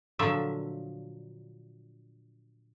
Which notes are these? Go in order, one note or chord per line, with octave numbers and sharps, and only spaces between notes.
A#2 D3 F3 F#3 A4 E5